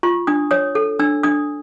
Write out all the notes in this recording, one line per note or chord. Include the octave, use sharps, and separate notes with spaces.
F4 C#6
D4 D#6
C#5 D#6
A4
D4 E6
D4 D#6